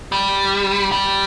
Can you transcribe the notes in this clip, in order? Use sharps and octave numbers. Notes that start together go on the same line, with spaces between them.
G3
G3